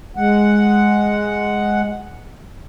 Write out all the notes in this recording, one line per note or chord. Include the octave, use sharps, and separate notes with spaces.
G#3 F#5